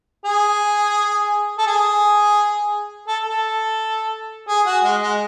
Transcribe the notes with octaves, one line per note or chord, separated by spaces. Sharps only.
G#4
A4
G#4
A4
A4
G#4
F#4
G#3
G#3